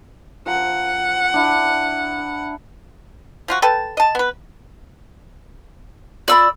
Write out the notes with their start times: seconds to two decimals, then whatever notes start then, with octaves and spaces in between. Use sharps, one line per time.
0.46 F3 F#5 A#5
1.34 D4 E4
3.48 F3 F4 F#4
3.62 A4 B4 G5 A5
3.97 D#5 A5
4.15 B3 B4
6.28 F4 D5 B5 E6